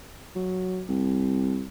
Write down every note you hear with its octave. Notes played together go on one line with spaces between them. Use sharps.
F#3
C2